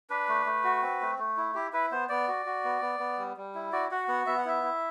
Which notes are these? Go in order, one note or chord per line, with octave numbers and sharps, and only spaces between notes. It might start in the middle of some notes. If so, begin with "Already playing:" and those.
D4 B4
A3
A3
F#4
C4
A3
A3
E4
E4 G4
E4 B4
B3 C5
B3 D5
F#4
F#4
B3
B3
B3
G3
G3
E4
F#4 D5
F#4 F#5
B3 F#5
B3 E5
F#5
E4 E5
E4